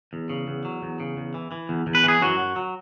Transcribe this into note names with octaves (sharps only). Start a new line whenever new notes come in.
E2
C#3
E2
F#3
E2
C#3
E2
E3
E3
E2
E2
B4
E3 G#4
F#2 F#3 F#4
F#3
F#3